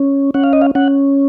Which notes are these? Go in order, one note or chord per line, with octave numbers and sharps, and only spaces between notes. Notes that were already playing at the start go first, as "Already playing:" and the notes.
Already playing: C#4
C#4 F#5
F5
D#5
F5
C#4 F#5